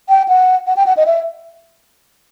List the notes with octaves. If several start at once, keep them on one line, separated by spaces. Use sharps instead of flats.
G5
F#5
F#5
G5
F#5
D#5
E5